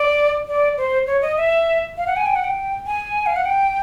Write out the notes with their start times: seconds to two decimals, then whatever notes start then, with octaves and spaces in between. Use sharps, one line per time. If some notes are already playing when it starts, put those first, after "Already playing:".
Already playing: D5
0.48 D5
0.77 C5
1.07 C#5
1.22 D#5
1.37 E5
1.97 F5
2.07 F#5
2.17 G#5
2.26 G5
2.36 F#5
2.44 G5
2.86 G#5
3.26 F5
3.36 F#5
3.46 G5